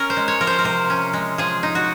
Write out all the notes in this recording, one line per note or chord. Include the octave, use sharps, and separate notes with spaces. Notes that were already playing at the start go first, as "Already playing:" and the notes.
Already playing: C#4 A#4
C5
G#3
C#5
F3 A#4
C5
A#4
C3 C5
C#4
G#3
F3 G#4
D#4
F#4